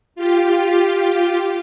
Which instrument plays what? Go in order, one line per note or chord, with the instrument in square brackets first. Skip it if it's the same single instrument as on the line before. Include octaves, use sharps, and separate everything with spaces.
[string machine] F4 G4